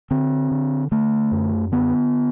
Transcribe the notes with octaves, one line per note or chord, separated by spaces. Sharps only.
D3 C4
D3
D3 A3
F#2
D3 B3